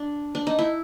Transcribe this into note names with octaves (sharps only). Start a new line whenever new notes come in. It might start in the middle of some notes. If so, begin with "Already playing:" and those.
Already playing: D4
D4
D#4
E4